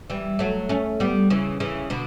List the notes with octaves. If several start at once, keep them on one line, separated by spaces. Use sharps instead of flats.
E3 G3
F#3 A3
A3 C#4
G3 B3
C#3 E3
C#3 E3
B2 D3